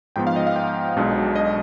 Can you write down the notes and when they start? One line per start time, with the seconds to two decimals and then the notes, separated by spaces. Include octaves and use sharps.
0.16 G#2 F3 B3 G5
0.27 F5
0.36 D#5
0.47 F5
0.56 G5
0.97 B1 B2 G#3 D4
1.36 D#5